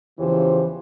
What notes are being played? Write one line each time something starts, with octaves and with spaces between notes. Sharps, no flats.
E2 C#3 E3 F3 G4 C5